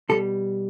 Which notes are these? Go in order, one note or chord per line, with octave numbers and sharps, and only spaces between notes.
B2 G3 A4